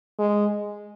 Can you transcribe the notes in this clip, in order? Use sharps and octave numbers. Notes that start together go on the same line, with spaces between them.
G#3